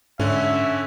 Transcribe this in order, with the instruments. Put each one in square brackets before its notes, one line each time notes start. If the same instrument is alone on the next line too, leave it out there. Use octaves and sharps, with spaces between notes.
[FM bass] G#2 [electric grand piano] D3 C#4 [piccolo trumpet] E5